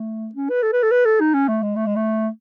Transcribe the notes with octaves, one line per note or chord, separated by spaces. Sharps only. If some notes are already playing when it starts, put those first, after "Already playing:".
Already playing: A3
C#4
B4
A4
B4
A4
B4
A4
D#4
C#4
A3
G#3
A3
G#3
A3